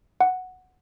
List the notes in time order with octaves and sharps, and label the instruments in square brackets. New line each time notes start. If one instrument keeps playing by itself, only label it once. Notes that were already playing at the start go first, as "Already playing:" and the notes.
[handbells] F#5